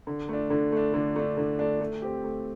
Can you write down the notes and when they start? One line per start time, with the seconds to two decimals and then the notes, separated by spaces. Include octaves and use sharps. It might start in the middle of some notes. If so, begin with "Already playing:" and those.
0.07 D3
0.29 A3 D4
0.50 D3
0.72 A3 D4
0.94 D3
1.16 A3 D4
1.37 D3
1.59 A3 D4
1.81 A3
2.02 C4 G4
2.24 A3